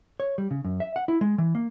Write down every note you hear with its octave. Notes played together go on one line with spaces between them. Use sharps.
C#5
G3
C#3
F#2
E5
F#5
E4
G#3
E3
A#3